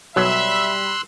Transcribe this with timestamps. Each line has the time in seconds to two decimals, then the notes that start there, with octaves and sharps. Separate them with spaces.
0.16 B1 F#3 G3 E5 B5 C6 E6 F#6